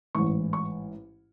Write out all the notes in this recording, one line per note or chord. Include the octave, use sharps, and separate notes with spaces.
A1 G#2 E3 C#6
C#6